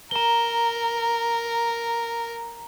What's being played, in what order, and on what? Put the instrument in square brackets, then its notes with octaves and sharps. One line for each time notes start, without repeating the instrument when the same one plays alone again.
[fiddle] A#4 [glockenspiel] A#5 G7